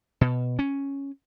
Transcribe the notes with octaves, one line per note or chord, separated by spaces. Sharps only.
B2
C#4